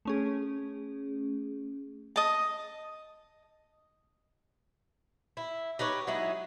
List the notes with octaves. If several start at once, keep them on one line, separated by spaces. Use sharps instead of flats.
A3 C#4 G#4
D#5 A5
E4
D#4 G4 B4 C#5
F#3 G#3 D#4 E4